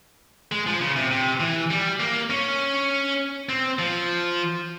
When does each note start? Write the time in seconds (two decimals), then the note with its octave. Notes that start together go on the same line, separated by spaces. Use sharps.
0.52 G#3
0.66 F3
0.81 C#3
0.96 C3
1.11 C3
1.40 E3
1.70 G3
2.00 A#3
2.30 C#4
3.49 C4
3.79 F3